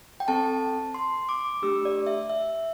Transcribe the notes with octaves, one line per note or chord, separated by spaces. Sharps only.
G5
C4 A4 A5
C6
D6
A3 D4 G4 E6
D5
E5
E5